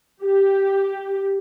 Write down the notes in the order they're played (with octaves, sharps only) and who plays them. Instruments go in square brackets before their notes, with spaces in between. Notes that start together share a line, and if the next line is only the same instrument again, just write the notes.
[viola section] G4